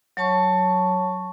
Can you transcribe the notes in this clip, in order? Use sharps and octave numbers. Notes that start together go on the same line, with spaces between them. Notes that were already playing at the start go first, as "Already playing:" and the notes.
F#3 C#5 A5 C#6